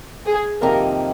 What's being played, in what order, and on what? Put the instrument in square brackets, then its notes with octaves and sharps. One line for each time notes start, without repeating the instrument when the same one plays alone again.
[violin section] G#4
[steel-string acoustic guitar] F2 C3 D#3 A#3 D#4 [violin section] A#4